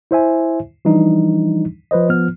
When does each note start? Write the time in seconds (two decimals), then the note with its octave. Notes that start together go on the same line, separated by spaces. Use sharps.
0.11 E4 C5 E5 G#5
0.85 E3 F3 G3 D4 D#4
1.91 F3 B4 C5 D#5
2.09 F3 B3 F6